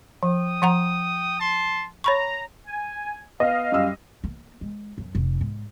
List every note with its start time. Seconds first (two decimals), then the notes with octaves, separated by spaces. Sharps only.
0.23 F3 G5 D#6
0.62 F3 F#5 A#5
1.39 A5 C6
2.04 C#5 A#5 B5 C#6
2.66 G#5
3.40 B3 D#5 F5
3.72 F#2 G3 E6
4.24 A#3
4.61 G#3
4.98 F#2
5.15 F1
5.41 G#2